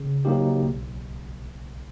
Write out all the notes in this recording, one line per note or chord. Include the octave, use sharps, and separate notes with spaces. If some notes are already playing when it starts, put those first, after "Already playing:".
Already playing: C#3
F#3 A#3 D#4 G4
B1